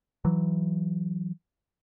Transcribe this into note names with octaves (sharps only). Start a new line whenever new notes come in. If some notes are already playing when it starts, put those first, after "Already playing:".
E3 F#3